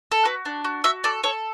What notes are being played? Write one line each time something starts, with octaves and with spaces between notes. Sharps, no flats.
A4
F#4 B4
D4
F#4
F#4 E5
A4 D5
A4 C#5